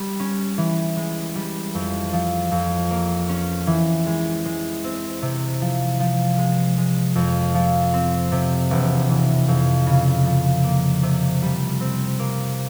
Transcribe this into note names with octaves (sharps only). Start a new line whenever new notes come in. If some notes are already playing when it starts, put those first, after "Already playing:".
Already playing: G3
C#4
E3
G#3
G3
F2
F3
F2
A#3
C#4
E3
G#3
G#3
C4
C3
F3
F3
G#3
G#3
F2
F3
C4
C3
E1
E3
F2
C#3
F3
A#3
C3
G3
C4
A#3